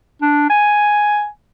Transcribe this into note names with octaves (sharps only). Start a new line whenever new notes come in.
D4
G#5